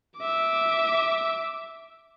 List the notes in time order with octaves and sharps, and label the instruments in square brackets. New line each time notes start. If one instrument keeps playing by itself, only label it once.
[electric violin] E5 D6